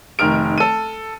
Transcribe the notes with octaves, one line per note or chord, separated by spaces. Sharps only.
F1 D#3 A#4 F6 D7
A4 D#7